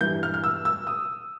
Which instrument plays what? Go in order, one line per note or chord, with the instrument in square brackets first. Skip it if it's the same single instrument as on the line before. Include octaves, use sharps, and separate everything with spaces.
[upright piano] G2 E3 G3 G6
F6
F6
E6
E6
D#6